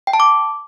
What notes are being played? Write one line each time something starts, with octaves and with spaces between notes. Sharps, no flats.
G5
A5
D6